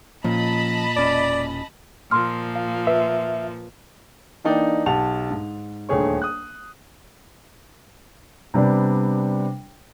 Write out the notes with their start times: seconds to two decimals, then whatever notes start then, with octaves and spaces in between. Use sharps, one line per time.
0.24 A#2 F3 C#4 D#5 A5 B5
0.97 E1 C#4 D5
2.11 A#2 F3 C6 E6 F6
2.55 F5
2.87 B4 E5
4.44 E3 A#3 D4 D#4 D5 G5
4.86 B1 G4 F#5 A5 F7
5.30 G#2
5.89 D#1 D2 A3 G#4 C#5 C#6
6.22 D#6 F#6
8.54 C3 G3 B3 D4